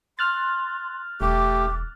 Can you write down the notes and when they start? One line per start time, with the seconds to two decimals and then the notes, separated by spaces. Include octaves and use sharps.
0.19 C6 F6 F#6 A6
1.21 E1 A3 G4 D6